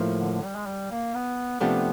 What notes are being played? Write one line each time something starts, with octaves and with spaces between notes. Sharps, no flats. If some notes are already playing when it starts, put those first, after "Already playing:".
Already playing: A2 F3 A#3
D3
D3
G3
G#3
G3
A#3
B3
C3 F3 A3 B3 D4 G4